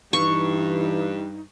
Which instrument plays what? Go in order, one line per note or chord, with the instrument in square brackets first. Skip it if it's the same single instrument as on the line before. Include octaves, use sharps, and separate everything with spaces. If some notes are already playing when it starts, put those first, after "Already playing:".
[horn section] G2 [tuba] E3 [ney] D#4 [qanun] C#6